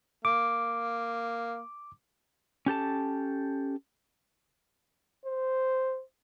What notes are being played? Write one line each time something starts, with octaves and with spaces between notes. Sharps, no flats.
A#3 D6
C#4 G4 A4 A5
C5